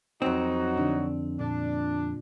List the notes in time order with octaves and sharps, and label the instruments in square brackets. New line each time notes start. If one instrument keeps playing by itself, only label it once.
[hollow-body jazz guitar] F2 C4 [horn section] F#3 D#4 F#4
[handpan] D3 D4
[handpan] A#2 [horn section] D4